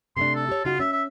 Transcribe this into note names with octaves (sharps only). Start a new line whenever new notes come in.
C3 A3 D4 C6
A4
G4 C#5
C#3 D#4 F4 F#4
C#4 E5
E5